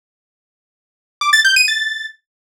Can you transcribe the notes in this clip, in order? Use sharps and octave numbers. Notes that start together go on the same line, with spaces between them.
D6
A6
G6
D#7
A6